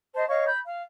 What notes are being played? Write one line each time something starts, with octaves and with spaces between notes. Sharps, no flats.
C5 D#5 A5
C#5 D#5 F5 C#6
B5 G6
F5